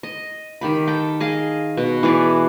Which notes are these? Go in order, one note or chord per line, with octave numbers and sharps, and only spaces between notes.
D#5
D#3 G4 B5
A4 G5
G#4 D#5 F5
B2
E3 G#4 B4 D5